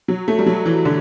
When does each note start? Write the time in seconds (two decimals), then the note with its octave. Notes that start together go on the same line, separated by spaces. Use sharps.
0.08 F#3
0.28 A3
0.39 G3
0.46 F#3
0.65 E3
0.85 D3